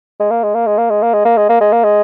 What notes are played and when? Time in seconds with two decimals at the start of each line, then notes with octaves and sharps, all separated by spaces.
0.20 G#3
0.31 A#3
0.43 G#3
0.55 A#3
0.67 G#3
0.78 A#3
0.90 G#3
1.02 A#3
1.13 G#3
1.25 A#3
1.37 G#3
1.49 A#3
1.61 G#3
1.73 A#3
1.84 G#3